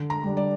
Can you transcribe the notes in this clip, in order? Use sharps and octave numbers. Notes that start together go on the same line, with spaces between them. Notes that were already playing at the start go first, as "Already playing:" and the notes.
Already playing: D3
A#5
G3 D4
D5